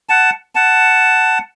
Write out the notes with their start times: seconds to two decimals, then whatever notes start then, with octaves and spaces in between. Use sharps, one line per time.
0.09 F#5 A5
0.55 F#5 A5